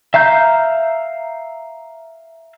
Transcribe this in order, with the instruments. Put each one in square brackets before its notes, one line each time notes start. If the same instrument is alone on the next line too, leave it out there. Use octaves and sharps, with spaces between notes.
[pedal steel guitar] E5 F5 A#5 G6